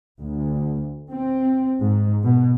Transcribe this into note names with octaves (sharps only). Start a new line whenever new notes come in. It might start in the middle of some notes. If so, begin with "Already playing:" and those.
D2
C4
G#2
B2